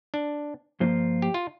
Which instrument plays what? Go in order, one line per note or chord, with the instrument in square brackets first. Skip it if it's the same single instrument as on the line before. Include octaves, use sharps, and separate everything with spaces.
[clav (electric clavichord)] D4
[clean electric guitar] G2 F3 A#3 F4 C5
[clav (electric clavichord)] G4
F4